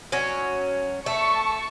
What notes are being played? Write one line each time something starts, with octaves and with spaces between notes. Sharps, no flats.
F#3 C#4
A3 A5 C#6